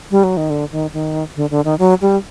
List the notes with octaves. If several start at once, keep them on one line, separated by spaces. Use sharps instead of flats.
G3
F#3
D#3
D3
D#3
D#3
D3
D3
D#3
F#3
G3